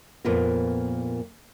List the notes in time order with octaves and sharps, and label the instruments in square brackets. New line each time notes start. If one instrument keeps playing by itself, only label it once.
[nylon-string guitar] F2 A#2 B3 F4 A#4